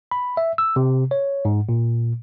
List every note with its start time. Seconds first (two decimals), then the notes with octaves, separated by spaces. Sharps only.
0.11 B5
0.37 E5
0.58 E6
0.76 C3
1.11 C#5
1.45 G#2
1.69 A#2